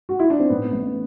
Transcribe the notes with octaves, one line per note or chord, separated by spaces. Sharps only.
F#4
E4
D4
C4
A2 B3
A1